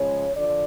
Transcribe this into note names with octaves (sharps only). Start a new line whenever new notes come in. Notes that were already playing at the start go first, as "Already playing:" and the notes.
Already playing: C#3 F3 G#3 C#5
D3 F3 D5